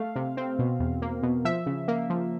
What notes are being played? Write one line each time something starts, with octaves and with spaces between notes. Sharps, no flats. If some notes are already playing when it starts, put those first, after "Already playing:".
Already playing: A3 F5
C3
C4
B2
E2
A#3
B2
F3 E5
C#3
A#3
F3